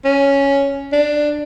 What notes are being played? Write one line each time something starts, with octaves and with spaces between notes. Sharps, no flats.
C#4
D4